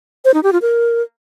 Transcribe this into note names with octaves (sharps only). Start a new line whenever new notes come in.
C5
D#4
G4
F4
A#4